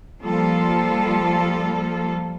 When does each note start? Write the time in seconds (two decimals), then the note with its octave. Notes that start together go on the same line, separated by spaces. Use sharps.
0.20 F3 G3 A#3 F4 A4